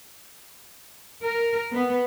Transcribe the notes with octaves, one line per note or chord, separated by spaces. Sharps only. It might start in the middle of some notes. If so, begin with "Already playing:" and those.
A#4
B3